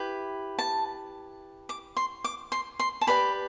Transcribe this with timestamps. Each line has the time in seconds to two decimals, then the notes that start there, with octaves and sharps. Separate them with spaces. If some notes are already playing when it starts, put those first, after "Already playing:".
Already playing: E4 G4 B4
0.59 A5
1.69 D6
1.97 C6
2.24 D6
2.52 C6
2.80 C6
3.01 A5
3.07 G4 B4 D5 B5